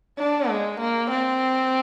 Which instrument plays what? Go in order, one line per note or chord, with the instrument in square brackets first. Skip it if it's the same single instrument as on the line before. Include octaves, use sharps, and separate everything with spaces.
[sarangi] D4
G#3
A#3
C4